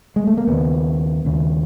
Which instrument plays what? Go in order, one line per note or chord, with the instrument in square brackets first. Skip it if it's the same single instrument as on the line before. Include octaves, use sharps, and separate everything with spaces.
[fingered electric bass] G#3
A3
A#3
D#2 C#3 B3
D#2 C#3